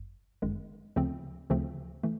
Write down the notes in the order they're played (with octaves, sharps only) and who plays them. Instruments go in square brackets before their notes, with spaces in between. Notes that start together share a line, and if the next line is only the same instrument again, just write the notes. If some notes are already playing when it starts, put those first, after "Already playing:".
Already playing: [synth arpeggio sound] G1 F#2
G1 F#2 D#3 G#3
D2 C#3 F3 A3 C4
D2 C#3 F3 A3 C4
E3 A3